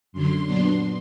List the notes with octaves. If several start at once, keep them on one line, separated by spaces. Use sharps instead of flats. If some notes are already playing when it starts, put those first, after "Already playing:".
F#2 D3 F#3 C6
A#2 F#3 B3 D4 C6